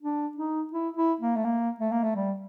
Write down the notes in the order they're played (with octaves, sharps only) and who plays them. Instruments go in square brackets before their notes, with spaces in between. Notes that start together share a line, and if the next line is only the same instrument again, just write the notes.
[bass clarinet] D4
D#4
E4
E4
A#3
A3
A#3
A3
A#3
A3
G3